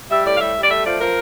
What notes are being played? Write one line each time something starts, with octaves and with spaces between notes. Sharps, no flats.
G3 E5
A2 D5
F5
G3 E5
G3
D5
A3 E5
F3 D5
F3 A#4